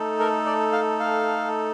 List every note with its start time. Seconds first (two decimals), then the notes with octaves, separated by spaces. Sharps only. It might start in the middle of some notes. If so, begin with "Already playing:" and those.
Already playing: A3 D#4 A4
0.20 A#4
0.46 D5
0.72 F5
1.00 F5